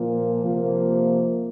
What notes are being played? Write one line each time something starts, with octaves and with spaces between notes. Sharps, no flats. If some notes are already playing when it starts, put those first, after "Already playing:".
Already playing: A#2 F3 A#3
C3 F3 A#3